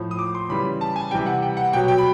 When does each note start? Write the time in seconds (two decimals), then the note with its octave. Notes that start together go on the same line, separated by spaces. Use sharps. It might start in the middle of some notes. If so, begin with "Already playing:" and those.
Already playing: A2 F3
0.11 D#6
0.19 D6
0.35 C6
0.49 C#3 E3 G3 B5
0.81 A5
0.96 G#5
1.11 C3 E3 G3 G5
1.26 F#5
1.42 G5
1.57 F#5
1.73 B2 F#3 G5
1.88 G5
1.98 B5